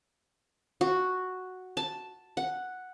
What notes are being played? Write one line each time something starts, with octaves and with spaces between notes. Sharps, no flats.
F#4
A5
F#5